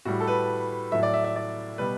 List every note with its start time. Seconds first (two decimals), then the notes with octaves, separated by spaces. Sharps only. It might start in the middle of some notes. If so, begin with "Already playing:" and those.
0.05 A2 G3 F#4
0.20 A4
0.27 B4
0.91 A2 F#3 A3 E5
1.03 D5
1.14 E5
1.24 E5
1.36 D5
1.78 B2 G3 B4